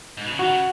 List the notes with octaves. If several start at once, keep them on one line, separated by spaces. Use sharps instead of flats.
G#2
B2
C#3
D#3 F#4
C#3